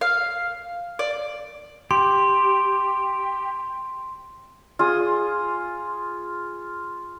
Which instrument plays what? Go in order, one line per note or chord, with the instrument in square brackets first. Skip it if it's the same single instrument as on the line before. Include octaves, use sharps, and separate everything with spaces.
[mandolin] F5
D5
[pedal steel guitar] G4 [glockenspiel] C6
[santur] F4 G#4 D#6